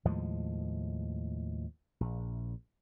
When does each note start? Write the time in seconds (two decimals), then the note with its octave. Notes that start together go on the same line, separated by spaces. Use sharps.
0.05 D#2 A2 F3 G#3
2.00 A#1